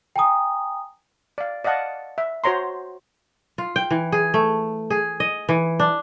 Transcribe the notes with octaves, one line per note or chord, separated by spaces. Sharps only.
G5 G#5 A#5 D#6
D5 F5
D5 D#5 F5 F#5 A5
E5
F#4 C5 C#5 A#5 C6
F4
G5
E3
G#4
A3
G#4
D#5
E3
D4